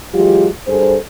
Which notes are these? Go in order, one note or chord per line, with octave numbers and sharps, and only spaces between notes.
E3 F#3 G#3 F4 G4
G2 G#4 A4 C5